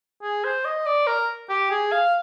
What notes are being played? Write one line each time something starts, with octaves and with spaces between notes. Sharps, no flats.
G#4
C5
D#5
D5
A#4
G4
G#4
F5